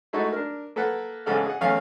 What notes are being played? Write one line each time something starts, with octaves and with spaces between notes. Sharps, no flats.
G#3 A3 D#4 E4 F#4 A4
D4 A#4
A#3 A4 B4 F#5
A1 G#2 C#3 A4 F#5 F6
G#4 F#5
A1 E2 A3 C#4 F5